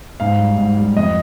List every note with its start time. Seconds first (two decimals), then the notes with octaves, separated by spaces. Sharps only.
0.20 G#2 F5
0.39 G3
0.58 G#2
0.77 G3
0.97 F2 D#5